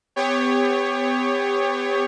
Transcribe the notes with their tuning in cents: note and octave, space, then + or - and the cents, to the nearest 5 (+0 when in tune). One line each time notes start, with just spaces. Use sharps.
B3 +40 G4 +30 C#5 +0